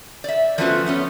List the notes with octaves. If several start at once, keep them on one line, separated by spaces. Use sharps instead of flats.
D5 E5
F3 A3 B3 C#4 F4 F#4
A3 B3 C#4